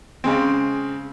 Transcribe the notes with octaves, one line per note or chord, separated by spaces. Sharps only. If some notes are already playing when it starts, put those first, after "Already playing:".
C#3 G#3 C4